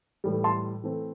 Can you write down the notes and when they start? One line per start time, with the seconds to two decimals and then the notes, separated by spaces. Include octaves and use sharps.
0.24 A2 E3 G3
0.44 A5 C6
0.84 E3 A3 C4